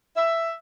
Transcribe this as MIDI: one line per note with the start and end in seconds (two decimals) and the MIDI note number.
0.17 0.51 76